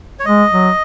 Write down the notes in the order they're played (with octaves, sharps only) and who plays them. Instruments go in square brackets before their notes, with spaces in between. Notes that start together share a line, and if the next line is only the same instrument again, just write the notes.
[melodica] C#5
[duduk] G#3 [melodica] D#5
[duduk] F#3